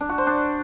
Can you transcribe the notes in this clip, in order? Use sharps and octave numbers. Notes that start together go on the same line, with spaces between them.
D4
F#4
C5
D4